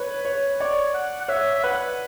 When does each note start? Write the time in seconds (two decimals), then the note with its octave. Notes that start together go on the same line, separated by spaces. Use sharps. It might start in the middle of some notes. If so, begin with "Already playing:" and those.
Already playing: B4 C#5
0.25 C#5
0.60 C#5 D5
0.94 F#5
1.21 F#5
1.28 C#5 E5
1.55 E5
1.63 B4 F#5